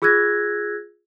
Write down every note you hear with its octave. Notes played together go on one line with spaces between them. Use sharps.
F4 G#4 E6 F#6 G#6 A#6